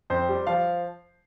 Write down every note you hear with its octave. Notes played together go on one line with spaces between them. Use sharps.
F2 C5
G3
F3 F5